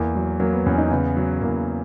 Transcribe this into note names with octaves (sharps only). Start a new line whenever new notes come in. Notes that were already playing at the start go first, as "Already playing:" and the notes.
Already playing: E2 A#3
F#3
F#3 A#3
B3
E2 C#4
D#4
C#3 B3
F#3
E2 A#3